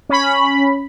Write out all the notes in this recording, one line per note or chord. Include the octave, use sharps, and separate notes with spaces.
C#4 B5